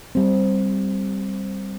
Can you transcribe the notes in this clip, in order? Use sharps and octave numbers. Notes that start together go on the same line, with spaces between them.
G3 C4